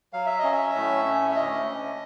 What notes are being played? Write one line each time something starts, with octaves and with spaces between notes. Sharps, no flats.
F#3 F5
E5
C#4 D#5
E5
A2
C#4
E5
D2 D#5
D2